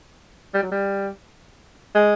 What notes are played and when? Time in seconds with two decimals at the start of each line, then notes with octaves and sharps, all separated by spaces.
0.54 G3
0.63 F#3
0.71 G3
1.94 G#3